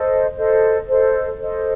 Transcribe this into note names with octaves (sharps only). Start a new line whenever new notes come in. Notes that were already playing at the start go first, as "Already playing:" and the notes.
Already playing: A4 C5 D#5
A4 C5 D#5
A4 C5 D#5
A4 C5 D#5